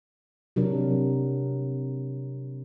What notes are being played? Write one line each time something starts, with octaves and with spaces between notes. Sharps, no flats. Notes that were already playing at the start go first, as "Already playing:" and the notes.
C3 F#3 D4 A#4